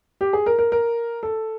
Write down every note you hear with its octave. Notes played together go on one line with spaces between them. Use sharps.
G4
G#4
A#4
A#4
A#4
A4